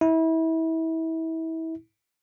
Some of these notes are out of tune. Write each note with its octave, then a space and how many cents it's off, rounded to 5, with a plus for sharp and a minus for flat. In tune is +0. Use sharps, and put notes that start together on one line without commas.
E4 -30